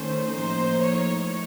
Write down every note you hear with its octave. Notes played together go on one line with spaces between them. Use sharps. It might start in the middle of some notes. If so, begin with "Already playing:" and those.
Already playing: D#3 A3 C#4 C5
A2 F3 A#3 D#4 C5
C#5